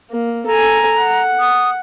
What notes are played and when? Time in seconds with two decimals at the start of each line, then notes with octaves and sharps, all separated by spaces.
0.11 A#3
0.47 A4 G#5 A#5
0.99 F#5
1.40 D#6